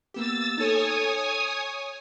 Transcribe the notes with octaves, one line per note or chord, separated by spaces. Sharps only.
A#3 B3 G4 E6 A6
D#4 A4 C#5 G#5 D#6
C#6